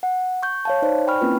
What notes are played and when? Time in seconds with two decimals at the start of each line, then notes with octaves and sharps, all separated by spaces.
0.03 F#5
0.43 C#6 G6
0.65 C#5 F5 A5
0.82 D#4 C5 D5
1.07 G5 G#5 B5 C#6 F6
1.21 A#3 C4 C#4 E4 F4 B4